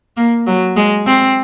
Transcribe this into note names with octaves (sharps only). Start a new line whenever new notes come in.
A#3
F#3
G#3
C4